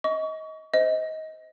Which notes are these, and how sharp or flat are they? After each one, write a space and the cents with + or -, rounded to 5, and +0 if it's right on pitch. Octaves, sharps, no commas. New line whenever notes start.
D#5 +25 C#6 +35
C5 -20 D#5 +25